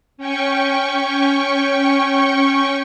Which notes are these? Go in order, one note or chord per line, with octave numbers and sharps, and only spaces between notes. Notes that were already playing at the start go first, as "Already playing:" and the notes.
C#4 G5 C#6